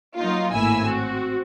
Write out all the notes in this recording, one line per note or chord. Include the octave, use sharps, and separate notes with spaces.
F#3 A#3 D#4 F4
G#1 A2 A#3 E4 G#5 E6
C4 F#4